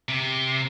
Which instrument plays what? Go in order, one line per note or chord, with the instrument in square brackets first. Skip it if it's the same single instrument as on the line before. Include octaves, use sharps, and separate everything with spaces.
[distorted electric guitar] C3